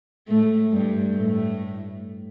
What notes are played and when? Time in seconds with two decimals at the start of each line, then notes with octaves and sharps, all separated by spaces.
0.29 A2 A3
0.72 G2 G3
1.15 A2 A3